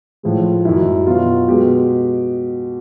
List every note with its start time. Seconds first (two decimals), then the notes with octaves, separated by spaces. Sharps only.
0.23 A2 F3 G#3
0.65 F#2 D#3 G3 E4
1.07 B2 F#3 F4
1.48 B2 G#3 G4